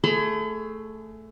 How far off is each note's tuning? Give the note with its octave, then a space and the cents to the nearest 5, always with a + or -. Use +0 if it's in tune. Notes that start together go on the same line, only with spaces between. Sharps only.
A3 +0 G#4 +15 B5 +45